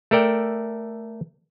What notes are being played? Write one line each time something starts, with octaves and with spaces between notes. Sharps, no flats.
A3 A4 A#4 D5 G5